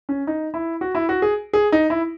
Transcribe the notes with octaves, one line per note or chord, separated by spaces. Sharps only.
C#4
D#4
E4
F#4
E4
F#4
G#4
G#4
D#4
E4